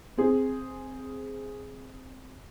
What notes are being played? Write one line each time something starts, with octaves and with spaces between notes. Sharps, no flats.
C4 G#4